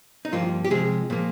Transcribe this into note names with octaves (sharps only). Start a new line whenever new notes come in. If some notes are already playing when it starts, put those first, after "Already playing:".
D#4
G2 F3 A#3 F4
G4
C3 F3 G#3 G#4
A#2 F3 A#3